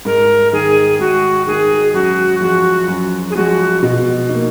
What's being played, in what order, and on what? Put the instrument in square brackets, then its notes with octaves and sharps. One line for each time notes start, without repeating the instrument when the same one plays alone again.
[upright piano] G#2 [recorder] A#4
[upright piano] D#3 G#3 [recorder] G#4
[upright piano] G#2 [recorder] F#4
[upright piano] D#3 G#3 [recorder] G#4
[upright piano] F#2 [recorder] F#4
[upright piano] F3 G#3 [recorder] F#4
[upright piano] F#2
[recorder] G#4
[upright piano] F3 G#3 [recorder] F#4
[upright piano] B2
A#3 D#4